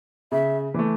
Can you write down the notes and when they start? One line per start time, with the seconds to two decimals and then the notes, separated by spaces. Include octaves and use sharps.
0.32 C#3 E5
0.74 E3 A3